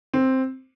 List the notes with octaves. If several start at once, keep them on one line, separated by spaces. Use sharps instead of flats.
C4